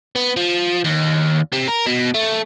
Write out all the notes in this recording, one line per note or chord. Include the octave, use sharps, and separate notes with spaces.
B3
F3
D#2
C3
A#4
B2
A3